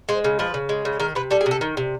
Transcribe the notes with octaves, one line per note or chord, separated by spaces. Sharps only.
G#3 C5
C#3
F3 B4
C#3
G#3
C#3
D#3 A#4
C3 B4
G3 A4
G#4
C3
A4
D#3
C3